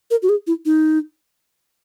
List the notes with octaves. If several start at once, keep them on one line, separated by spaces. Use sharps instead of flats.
A#4
F#4
G#4
E4
D#4